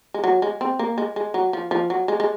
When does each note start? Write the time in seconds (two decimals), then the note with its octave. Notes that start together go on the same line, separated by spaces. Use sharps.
0.14 G#3
0.24 F#3
0.42 G#3
0.61 C4
0.79 A#3
0.98 G#3
1.16 G#3
1.34 F#3
1.53 F3
1.71 F3
1.90 F#3
2.08 G#3
2.20 G#3